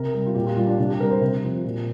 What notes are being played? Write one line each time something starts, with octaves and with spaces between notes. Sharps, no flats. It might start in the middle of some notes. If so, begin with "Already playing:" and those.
Already playing: C3 A#4
G3
F4
A#2 G4
F4
G3 F4
D4
C3 D4
G4
G3 A#4
C5
C3
F3
A#2